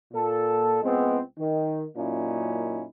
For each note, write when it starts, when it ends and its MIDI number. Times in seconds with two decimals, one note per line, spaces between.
0.13 0.80 46
0.13 0.80 69
0.83 1.20 37
0.83 1.20 56
0.83 1.20 59
0.83 1.20 60
1.39 1.86 51
1.96 2.84 42
1.96 2.84 46
1.96 2.84 58
1.96 2.84 61
1.96 2.84 63
1.96 2.84 64